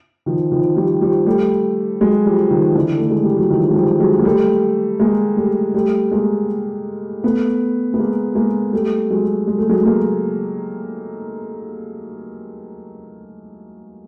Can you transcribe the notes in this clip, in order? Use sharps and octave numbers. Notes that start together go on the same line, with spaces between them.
D#3 F3
D#3 F3
F3 G3
F3 G3
G3 A3
F#3 G#3
F3 G3
D#3 F3
D3 E3
A3
G#3
G3
F#3
D#3 F3
G#3
F3 G3
F#3 G#3
A#3
G3 A3
G#3 A#3
G3 A3
G3 A3
G#3 A#3
A3 B3
B3
G#3 A#3
G#3 A#3
G3 A3
F#3 G#3
G#3
A3
F#3 G#3
G#3 A#3